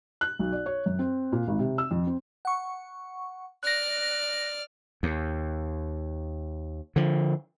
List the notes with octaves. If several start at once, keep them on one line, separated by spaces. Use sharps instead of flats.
F#6
B1
D5
C#5
F#2
C4
A#2
G#1
C3
E6
F2
C4
F#5 C#6
D5 F6 F#6 A#6
D#2
D3 F3